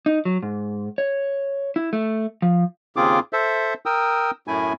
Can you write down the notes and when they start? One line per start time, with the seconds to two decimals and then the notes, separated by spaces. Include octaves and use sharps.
0.06 D#4
0.25 F#3
0.43 G#2
0.98 C#5
1.76 E4
1.93 A3
2.42 F3
2.96 D#2 C#3 C4 F4 G#4 D6
3.33 A4 C5 E5
3.86 A#4 G5 D#6 E6
4.48 F#2 A2 A3 E4 G#5